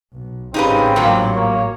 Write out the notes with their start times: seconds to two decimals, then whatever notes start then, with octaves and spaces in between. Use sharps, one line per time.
0.12 B1
0.54 A1 G#2 C#3 C4 D#4 G4 B4
0.96 G2 A#2 F#3 A#3
1.36 A#3 C#5